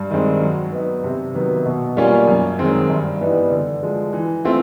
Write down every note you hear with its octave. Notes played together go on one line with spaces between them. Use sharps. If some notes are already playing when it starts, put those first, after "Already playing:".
Already playing: G2
D#3 G#3 C4
F#3
B3 D#4
C3
D#3 F#3 B3
B2
G3 A#3 C#4 F4
F#2
D#3 G#3 C4
G2
E3 G3 B3 D#4
D3
F3 G#3
E3
A3 C4 F4